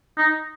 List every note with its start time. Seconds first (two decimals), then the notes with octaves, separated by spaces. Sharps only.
0.18 D#4